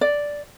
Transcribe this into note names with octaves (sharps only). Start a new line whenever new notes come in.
D5